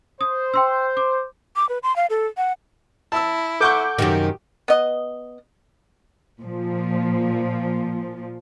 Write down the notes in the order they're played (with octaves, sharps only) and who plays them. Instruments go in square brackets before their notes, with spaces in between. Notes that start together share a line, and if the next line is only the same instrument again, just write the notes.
[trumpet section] C5 [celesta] D#6
[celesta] G5 C6 E6
D6
[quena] D6
B4
C6
F5
A4
F#5
[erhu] E4 [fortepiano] A5 E6
[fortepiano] A4 F#5 C#6 [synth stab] D6 G6
[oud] F#2 C3 D#3 [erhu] G4
[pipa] B3 D#5
[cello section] A#2 F3